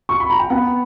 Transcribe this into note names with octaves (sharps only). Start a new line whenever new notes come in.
C#6
B5
A#5
G5
B3 F#5